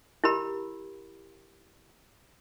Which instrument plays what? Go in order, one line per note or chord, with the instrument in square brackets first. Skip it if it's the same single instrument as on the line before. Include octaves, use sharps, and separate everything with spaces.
[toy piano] E4 G4 A#4 B5